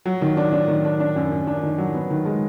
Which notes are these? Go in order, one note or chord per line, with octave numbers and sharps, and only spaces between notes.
F#3
D#3
D4
D4
D#3
D4
D4
F#2
F#2
D4
D#3
F#3
B3
D#3
G#3